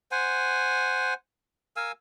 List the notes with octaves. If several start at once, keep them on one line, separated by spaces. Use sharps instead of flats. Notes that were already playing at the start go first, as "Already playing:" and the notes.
C5 F#5 G#5
A#4 F5 G#5 E6